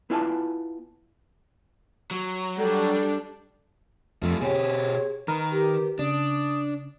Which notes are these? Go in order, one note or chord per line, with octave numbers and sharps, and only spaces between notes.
B3 E4 F4 D5 G#5 A5
F#3
G3 D4 A4
F2 F3 A3
B2 G4 G#4 C#5
D#3 A#4 B4
G4
C#3 D4 D#6